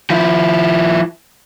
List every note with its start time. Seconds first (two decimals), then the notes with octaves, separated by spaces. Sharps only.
0.10 F3 E4